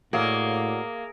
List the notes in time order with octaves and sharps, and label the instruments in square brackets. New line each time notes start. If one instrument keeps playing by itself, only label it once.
[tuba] A2 [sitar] A#3 [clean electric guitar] F#4 C#5 D5 [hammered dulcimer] G#4 E5